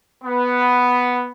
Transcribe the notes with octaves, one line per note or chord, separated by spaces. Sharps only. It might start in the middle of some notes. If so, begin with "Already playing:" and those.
B3